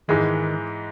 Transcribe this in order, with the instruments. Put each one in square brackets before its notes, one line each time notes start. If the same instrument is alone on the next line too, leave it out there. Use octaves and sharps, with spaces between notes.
[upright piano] G#2 E3 G#3 [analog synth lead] D#3